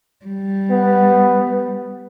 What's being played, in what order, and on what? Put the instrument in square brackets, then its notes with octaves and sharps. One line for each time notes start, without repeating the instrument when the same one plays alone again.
[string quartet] G3
[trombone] B3